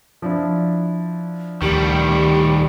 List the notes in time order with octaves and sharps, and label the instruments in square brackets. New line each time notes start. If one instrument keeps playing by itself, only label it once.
[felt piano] F3 D4 E4
[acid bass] D2 [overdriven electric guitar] D#3 G3 [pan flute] G4